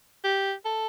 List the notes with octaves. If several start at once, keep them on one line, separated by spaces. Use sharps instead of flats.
G4
A4